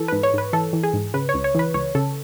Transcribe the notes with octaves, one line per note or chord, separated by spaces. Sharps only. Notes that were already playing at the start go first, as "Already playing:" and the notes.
Already playing: E3 A4
G#2 B4
C#5
G#2 B4
E3 A4
E3
G#4
G#2
C#3 B4
C#5
C#2
C#5
E3 B4
C#2 C#5
C#3 A4